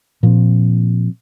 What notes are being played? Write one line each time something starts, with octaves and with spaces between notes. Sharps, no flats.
A#2 F3 C4